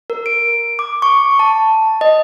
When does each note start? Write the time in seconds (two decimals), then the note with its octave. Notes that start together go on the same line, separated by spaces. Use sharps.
0.10 A#4
0.26 D7
0.79 D6
1.02 C#6
1.39 A5
2.01 D#5